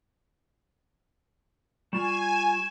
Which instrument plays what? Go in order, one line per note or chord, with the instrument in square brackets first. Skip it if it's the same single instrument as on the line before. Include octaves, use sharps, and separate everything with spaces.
[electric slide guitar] G3 F4 [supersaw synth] G#5 [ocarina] C#6 [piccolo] E7